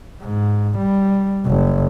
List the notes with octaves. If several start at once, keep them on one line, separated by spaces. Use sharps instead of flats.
G#2
G3
F#1